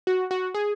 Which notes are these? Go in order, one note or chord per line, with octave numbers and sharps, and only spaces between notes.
F#4
F#4
G#4